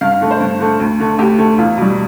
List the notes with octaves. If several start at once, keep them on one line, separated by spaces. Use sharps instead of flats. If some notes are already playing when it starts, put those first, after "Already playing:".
G2 F5
F5
D3 A3
C5
G2
D3 A3
D2
D3 A3
D2 G4
D3 A3
E2 F4
B2 G3